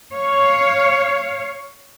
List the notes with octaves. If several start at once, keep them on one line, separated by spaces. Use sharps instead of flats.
C#5 F5